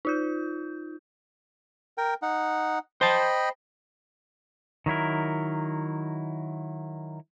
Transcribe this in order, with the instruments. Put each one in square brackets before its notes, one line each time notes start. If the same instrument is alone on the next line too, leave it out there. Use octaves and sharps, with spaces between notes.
[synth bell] D#4 F4 G6
[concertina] A#4 G5
D#4 F#5
[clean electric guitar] C5 A5 [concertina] D#5 G5 B5
[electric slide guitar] D#3 F#3 E4 A#4